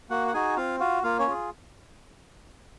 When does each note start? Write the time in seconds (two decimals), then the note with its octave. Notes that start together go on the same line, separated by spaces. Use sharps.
0.10 A#3 F#4 F#5
0.27 F#5
0.34 D#4 F#4 G#4 G#5
0.57 C4 F4 F5
0.80 F4 F#4 F5
1.03 A#3 F4 F5
1.19 C#4 C#5
1.27 F4 G#4